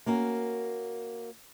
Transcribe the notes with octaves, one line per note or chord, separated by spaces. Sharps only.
A#3 C#4 F#4 A#4